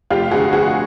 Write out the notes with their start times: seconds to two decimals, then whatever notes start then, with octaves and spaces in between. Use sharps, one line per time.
0.11 F1 F4 G4
0.31 F2 D3 F#4 G#4
0.52 F1 F#4 G#4